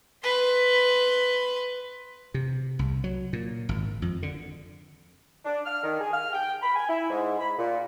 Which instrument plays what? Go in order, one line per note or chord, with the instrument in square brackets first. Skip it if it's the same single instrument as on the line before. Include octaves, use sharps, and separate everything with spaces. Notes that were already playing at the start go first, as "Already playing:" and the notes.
[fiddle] B4 C6
[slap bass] C3
C2
F#3
A#2
G#1
F2
D3
[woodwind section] D4
F6
D#3
G#4
F6
G5
B5
G#5
E4
G#2
B5
A#2